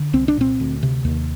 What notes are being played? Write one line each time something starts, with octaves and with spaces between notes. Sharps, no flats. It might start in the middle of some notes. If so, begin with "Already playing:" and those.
Already playing: D3
C2 C4
D4
A#2 C4
D2
C3
D#2